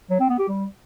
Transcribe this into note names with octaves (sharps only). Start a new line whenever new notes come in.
F#3
C4
B3
G4
G3